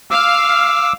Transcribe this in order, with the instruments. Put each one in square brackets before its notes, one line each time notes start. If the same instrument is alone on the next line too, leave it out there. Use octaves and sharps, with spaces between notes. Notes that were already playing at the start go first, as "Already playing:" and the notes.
[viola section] F5 [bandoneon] D6 E6